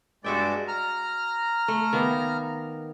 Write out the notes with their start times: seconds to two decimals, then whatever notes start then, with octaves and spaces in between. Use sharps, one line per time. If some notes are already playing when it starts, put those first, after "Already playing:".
0.24 G2 G#3 F#4 D5 E5 G5
0.68 A#5 F6
1.68 A3
1.93 D#3 A#3 B3